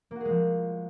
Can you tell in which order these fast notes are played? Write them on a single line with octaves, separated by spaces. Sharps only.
A#3 F#4 G#4 G#3 F3